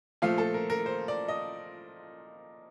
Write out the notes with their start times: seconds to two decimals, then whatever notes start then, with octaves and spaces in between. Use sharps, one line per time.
0.22 A#2 F3 A3 F5
0.38 A4
0.54 A#4
0.70 A#4
0.86 C5
1.08 D5
1.28 D#5